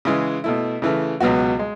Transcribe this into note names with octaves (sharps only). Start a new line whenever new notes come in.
C#3 E3 G#3
B2 A3 E4
C#3 E3 A3
C#2 B2 F#3 B3 F#4
G#3